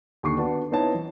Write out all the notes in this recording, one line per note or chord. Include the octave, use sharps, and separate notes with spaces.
D#2 D3 C#6 C7
B3 D4 F#4 D5 F#5 A5
B3 C4 D#4 E4 C#5 A5
E3